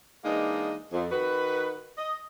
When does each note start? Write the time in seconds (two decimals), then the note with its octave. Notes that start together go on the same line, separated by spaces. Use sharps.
0.25 E3 G#3 A#3 D4 D#4
0.93 F2
1.11 D#3 F#4 B4
1.98 D#5